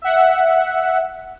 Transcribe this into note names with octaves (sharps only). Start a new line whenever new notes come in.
E5 F#5